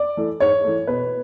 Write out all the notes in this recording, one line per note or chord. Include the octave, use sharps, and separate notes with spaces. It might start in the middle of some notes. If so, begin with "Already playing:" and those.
Already playing: D5
E3 A3
G#2 C#5
E3 A3
B2 B4